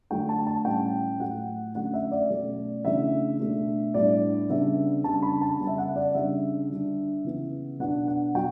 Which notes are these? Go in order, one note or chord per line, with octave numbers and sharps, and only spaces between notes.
D3 F#3 A3 D4 G5
A5
A5
A2 G3 C#4 G5
A2 F#3 A3 F#5
D3 F#3 A3 C#4 F#5
E5
D5
B2 F#3 A3 C#4
C#3 E3 A3 D4 E5
B2 A3 D4
A2 G3 B3 D4 D5
C#3 G3 B3 D4 E5
C#3 G3 D4 A5
B5
A5
C#3 G3 B3
E5
F#5
D5
C#3 G3 D4 E5
D3 G3 D4
C#3 E3 B3
B2 F#3 B3 D4 F#5
F#5
B2 F#3 G5